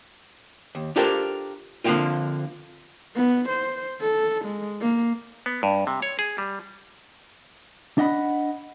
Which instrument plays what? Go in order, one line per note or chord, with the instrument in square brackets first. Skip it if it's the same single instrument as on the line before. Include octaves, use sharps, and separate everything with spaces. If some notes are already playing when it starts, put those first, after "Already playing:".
[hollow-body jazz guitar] D#2
D4 F4 G4 A4 A#4 C5
D3 F3 A#3 C4 F4
[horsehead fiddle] B3
C5
A4
G#3
A#3
[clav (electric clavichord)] B3
G2
C3
C#5
G#4
G3
[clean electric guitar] D4 D#5 F#5 B5